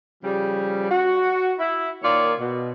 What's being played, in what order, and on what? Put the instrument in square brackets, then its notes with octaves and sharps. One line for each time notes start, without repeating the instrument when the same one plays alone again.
[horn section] C#3 F3 G3
F#4
E4
D#3 A#3 F4 C#5 D5
B2